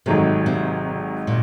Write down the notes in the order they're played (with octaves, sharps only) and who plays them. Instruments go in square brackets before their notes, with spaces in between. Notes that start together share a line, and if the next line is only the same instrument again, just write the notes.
[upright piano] G#1 G#2 D#3 F#3 A3 [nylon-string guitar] C3
[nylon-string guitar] C3
A#2